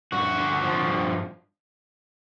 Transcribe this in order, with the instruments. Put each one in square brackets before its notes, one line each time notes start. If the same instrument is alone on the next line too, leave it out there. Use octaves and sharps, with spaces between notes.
[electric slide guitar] G2 F#4
D3
F3
G2